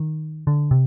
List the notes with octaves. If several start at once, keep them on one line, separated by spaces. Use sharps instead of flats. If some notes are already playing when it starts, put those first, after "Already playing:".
Already playing: D#3
D3
C3